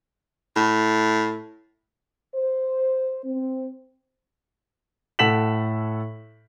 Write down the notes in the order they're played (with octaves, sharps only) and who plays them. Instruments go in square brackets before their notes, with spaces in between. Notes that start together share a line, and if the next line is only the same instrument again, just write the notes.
[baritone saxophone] A2
[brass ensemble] C5
C4
[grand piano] A2 A4 F#5 B6 E7 F#7